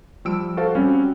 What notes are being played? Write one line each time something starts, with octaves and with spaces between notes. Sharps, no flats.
F3 G3 E6 D7
F#4 A4 C5 F5
G3 C4 C#4 F#4